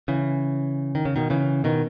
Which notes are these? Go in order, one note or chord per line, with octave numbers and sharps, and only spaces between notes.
C#3 E3
D#3
C#3
B2 D#3
C#3 E3
B2 D#3